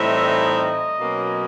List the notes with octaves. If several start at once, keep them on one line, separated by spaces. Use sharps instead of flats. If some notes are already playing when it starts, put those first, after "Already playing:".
Already playing: A2 E3 G3 C4 D#4 E5
D#5
B2 F#3 A#3 C#4